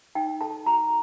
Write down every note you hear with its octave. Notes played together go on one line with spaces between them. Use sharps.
D#4 G5
A4 A5
F#4 A#5